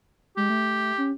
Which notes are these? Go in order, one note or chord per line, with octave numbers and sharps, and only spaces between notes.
G#3 G4
A3
C#4